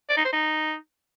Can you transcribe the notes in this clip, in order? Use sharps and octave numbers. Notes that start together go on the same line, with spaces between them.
D5
D#4
C5
D#4